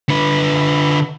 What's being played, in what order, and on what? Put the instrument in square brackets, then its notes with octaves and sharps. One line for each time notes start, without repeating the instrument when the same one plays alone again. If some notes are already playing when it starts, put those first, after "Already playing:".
[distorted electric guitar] D3 B4